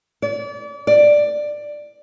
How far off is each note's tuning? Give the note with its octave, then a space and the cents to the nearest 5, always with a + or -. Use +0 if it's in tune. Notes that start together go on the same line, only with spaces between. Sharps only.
D5 -35
D5 +10